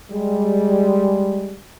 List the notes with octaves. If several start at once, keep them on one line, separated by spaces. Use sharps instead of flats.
G3 G#3